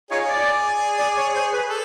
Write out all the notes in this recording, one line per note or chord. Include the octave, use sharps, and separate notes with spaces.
D#4 F4 G#4 C#5
D5
D5
C#5
C5
B4
A4